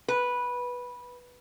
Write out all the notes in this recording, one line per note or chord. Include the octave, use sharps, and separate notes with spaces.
B4